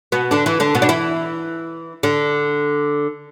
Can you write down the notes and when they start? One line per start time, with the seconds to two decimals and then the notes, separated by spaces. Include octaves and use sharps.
0.12 B2 B3
0.31 D3 D4
0.46 E3 E4
0.60 D3 D4
0.75 B2 B3
0.82 D4
0.89 E3 E4
2.03 D3 D4